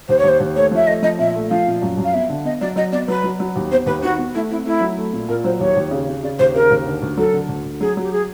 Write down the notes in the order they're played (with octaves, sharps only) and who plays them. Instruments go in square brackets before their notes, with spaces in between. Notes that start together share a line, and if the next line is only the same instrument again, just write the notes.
[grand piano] D#2 [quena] C5
[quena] C#5
[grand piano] D#2 [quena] C5
[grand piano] D#2
[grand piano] A3 [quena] C#5
[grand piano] F3 [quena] E5
[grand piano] A3 [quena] D#5
[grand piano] F3 [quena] D#5
[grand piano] A#2 [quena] E5
[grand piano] A3
[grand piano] F3 [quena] F5
[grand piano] A#2
F#2
F#2
[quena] F5
[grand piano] B3 [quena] E5
[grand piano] D3
[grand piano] B3 [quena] D#5
[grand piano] F#3 [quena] D5
[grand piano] F#3 [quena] D#5
[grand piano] B3 [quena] D5
[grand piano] F#3 [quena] B4
[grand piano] F#3
F#3
D#2
[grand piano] B3 [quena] C5
[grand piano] D#2 [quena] B4
[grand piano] D#3 [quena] F#4
[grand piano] B3
[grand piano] A3 [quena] E4
[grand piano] C4 [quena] E4
[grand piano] A3 [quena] E4
[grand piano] F#3
A3
A#2
[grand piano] A#2 [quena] A#4
[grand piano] F#3 [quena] C5
[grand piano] D#2 [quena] C#5
[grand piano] D#2
C#3
C#3
[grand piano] C#3 [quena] D5
[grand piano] D#2 [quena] C5
[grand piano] C#3 [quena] A#4
[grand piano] D#2
D3
D2
[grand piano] F#3 [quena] A4
[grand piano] D3
D2
D2
[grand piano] F#3 [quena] G#4
[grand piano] F#3 [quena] G4
[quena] G#4